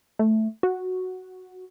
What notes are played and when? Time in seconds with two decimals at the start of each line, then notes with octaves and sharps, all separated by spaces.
0.19 A3
0.63 F#4